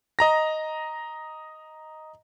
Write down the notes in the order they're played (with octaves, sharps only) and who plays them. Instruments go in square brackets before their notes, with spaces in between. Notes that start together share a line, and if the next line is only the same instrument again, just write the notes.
[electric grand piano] D#5 A#5 A#6